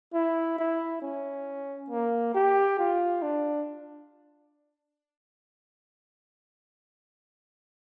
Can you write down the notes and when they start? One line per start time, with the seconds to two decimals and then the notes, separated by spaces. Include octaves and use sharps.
0.14 E4
0.59 E4
1.02 C#4
1.90 A#3
2.35 G4
2.79 F4
3.22 D4